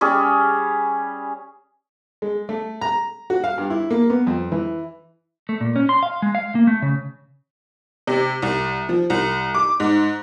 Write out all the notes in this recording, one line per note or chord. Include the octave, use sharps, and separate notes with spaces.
G3 C#4 G#4
G#3
A3
A#5
F#4
F5
G2
E4
A#3
B3
F2
E3
A3
A#2
C#4
C6
F5
G#3
F5
A#3
A3
C#3
C3
C2
F3
C2
D6
G#2